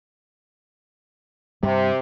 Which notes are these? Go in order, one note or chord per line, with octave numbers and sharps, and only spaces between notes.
G2 C3 G3